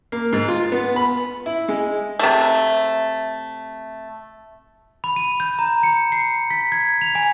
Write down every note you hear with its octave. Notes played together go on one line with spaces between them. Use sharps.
A#3
G#2
F4
B3
B5
E4
G#3
C3 A3
B5
D#7
G6
A#5
C#7
C7
B6
G#6
F7
G#5